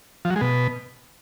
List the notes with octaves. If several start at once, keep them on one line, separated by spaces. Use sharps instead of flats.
F3
F#3
G#3
B2